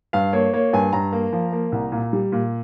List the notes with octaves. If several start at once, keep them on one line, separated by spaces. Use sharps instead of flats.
G2 F5
A#3 C#5
A#3 C#5
G2 G#5
G2 A#5
A#3
F3
A#3
C2
A#2
G3
A#2